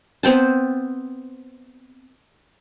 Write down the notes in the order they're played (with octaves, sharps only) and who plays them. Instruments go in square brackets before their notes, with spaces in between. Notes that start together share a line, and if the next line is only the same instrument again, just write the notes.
[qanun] B3 C4 G5 A5